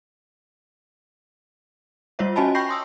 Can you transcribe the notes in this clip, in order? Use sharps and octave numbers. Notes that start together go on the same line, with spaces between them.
G3 F4 C5 C#5 E5
C#4 F#4 D#5 G#5 A5 B5
G5 B5 C#6 G6 A#6 C7
C6 D#6 E6